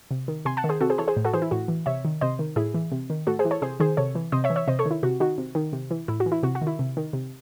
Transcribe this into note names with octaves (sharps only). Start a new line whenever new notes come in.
C3
D#3
C3 G#5 C6
F#5 A5
D#3
G#4 C5
C3 F#4 A4
G#4 C5
E3 A4 C#5
G#4 C5
A2
F#4 A4
E3 G#4 C5
E4
A2 F#4
E3
C3 C#5 E5
D#3
C3 C5 D#5
D#3
A2 E4 G#4
E3
C3
D#3
A2 F#4 A4
G#4 C5
E3
A4 C#5
C3 G#4 C5
D#3 G#4 C5
C3 A4 C#5
E3
C3 C5 D#5
C#5 E5
E3
C#5 E5
C3 C5 D#5
A4 C#5
D#3
E4
C3 F#4
D#3 F#4
C3
D#3
C3
E3
A2 E4
F#4
E3
E4
C3 F#4
F#4
D#3
E4
C3
D#3
C3